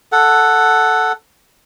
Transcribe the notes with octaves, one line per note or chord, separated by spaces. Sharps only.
A4 F#5